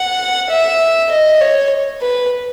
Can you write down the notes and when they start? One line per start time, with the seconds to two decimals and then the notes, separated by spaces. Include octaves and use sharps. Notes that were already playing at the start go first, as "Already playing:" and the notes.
Already playing: F#5
0.50 E5
1.11 D#5
1.41 C#5
2.01 B4